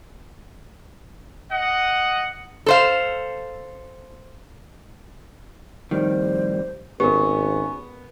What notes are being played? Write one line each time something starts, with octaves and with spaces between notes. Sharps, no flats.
D#5 F#5
A4 C5 F5
F2 A2 D#3 G3 C5
G#1 B3 C#4 G4 A#4